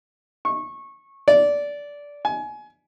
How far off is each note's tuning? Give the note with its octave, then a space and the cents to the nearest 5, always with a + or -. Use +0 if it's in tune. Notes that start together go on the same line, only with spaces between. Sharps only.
C#6 -20
D5 -15
G#5 +25